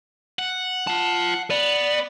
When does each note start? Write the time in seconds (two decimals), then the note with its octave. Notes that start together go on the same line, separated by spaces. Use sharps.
0.39 F#5
0.87 F4 A5
1.51 B3 D5